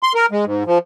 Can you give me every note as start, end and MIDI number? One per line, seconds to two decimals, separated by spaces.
0.03 0.13 84
0.15 0.26 70
0.31 0.45 56
0.45 0.63 44
0.66 0.78 53